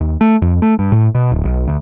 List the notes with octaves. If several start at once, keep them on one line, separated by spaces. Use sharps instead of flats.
D#2
A3
F2
A3
G2
A2
B2
D1
B1
D2